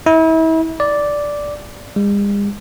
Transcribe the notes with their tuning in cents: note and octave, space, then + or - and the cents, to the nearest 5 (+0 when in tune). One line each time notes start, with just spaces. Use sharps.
E4 -35
D5 -5
G#3 -45